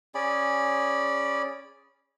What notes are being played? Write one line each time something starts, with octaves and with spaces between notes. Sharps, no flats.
C#4 G#4 D5 B5